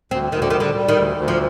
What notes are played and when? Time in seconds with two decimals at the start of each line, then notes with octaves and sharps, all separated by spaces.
0.11 D2 C4
0.32 D2 D#3
0.42 D3
0.50 D#3
0.54 G3
0.60 D3
0.75 G3
0.88 D#3
0.96 D2
1.17 D2
1.28 F3